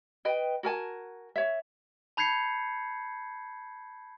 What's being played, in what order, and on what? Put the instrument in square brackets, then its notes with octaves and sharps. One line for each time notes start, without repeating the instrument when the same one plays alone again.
[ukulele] B4 D#5 G5
F#4 A#4 G#5 A5
C#5 E5
[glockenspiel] A5 B5 G6 G#6 C7 C#7